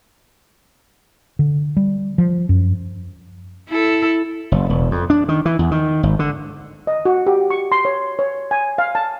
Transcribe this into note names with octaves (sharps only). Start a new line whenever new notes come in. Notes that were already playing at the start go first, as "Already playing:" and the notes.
D3
G3
F3
F#2
E4 A4
F#1
E1
F2
D4
D#3
E3
E2
D#3
G#1
D3
D#5
F#4
G4
C#6
C6
C#5
C#5
G#5
F5
A5